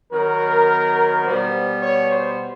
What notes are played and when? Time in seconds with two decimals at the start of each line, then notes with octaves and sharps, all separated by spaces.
0.11 D#3 F#3 B3 A#4
1.25 B2 G3 B3 C5
1.82 C#5
2.11 C5